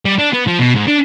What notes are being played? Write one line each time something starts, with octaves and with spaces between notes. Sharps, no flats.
G3
D4
B3
F3
B2
G#2
D4